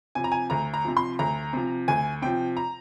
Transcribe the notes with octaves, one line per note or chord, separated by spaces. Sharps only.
C3 F3 G#5
A#5
G#5
D2 A#5
A#5
C3 F3
C6
D2 A#5
C3 F3
D2 G#5
C3 F3 G5
A#5